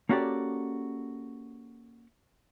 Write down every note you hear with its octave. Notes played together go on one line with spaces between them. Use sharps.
A#3 C#4 F#4 G4 A4 D5